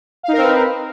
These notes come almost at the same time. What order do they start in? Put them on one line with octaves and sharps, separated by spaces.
F5 D#4 A#4 C4 B4